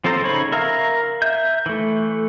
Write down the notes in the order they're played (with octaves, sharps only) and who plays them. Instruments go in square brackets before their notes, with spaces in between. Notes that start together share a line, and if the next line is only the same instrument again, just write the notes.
[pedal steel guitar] F3 C4 A4 C5 A#5
C#3 D#4 C#5 B5
A#4 E5 F5 A#5
E5 G6
E3 A3